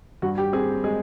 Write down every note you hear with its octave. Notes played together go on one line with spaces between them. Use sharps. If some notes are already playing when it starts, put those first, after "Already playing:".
G2 F#4
G4
C4 G#4
G#3 G#4